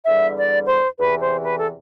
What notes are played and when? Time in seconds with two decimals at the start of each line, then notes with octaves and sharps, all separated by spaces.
0.06 E2 D3 G3 E5
0.37 D5
0.68 C5
0.98 E2 C3 E3 B4
1.21 C5
1.45 B4
1.60 A4